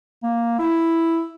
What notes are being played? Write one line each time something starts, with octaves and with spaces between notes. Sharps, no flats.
A#3
E4